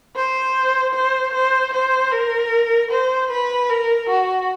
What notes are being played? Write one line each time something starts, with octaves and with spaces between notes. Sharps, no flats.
C5
C5
C5
C5
A#4
C5
B4
A#4
F#4